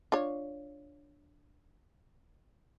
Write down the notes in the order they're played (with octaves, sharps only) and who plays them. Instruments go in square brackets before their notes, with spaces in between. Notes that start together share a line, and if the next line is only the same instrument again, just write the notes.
[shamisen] D4 F4 C#5